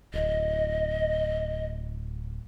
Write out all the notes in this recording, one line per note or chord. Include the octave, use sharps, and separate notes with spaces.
D1 D#5